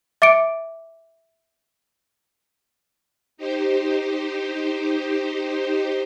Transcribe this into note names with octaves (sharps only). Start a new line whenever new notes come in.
E5 D6 C#7 D7
D#4 G4 C5